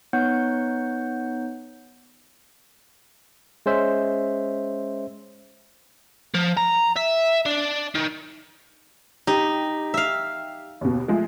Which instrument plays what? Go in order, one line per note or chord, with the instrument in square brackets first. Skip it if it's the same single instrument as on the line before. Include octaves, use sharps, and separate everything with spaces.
[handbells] B3 D#4 C#5 F#5 G6
[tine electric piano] G#3 C#4 C5 E5
[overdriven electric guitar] F3
A#5
E5
D4
D#3
[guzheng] D#4 [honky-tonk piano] G4
[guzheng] E5 F5
[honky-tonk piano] D#2 B2
F3 G#3 A3